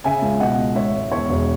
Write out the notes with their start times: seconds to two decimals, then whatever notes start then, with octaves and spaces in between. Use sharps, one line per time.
0.04 C#3 E5 G#5
0.22 C#2
0.40 B2 D#5 F#5
0.58 C#2
0.75 G#2 C#5 E5
0.93 G#1
1.11 E2 C#5 E5
1.29 E1